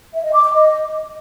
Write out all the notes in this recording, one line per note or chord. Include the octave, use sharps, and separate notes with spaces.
E5
D#5
D6
D6
D#5